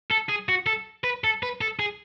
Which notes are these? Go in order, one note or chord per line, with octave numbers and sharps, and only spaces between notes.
A4
G#4
F#4
A4
B4
A4
B4
A4
G#4